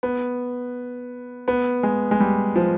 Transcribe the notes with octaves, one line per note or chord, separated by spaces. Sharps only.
B3
B3
G#3
G#3
G3
F3